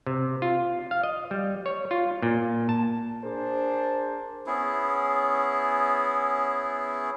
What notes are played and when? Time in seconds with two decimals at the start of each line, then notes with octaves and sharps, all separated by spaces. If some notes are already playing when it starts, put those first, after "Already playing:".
0.06 C3
0.42 F4
0.91 F5
1.03 D#5
1.31 G3
1.66 C#5
1.91 F4
2.22 A#2
2.69 A5
3.23 D4 G#4 A#4 C5
4.46 B3 C#4 E4 G#4